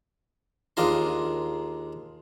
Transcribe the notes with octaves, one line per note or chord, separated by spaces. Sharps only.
D#2 G#3 D4 F4 A#4 C6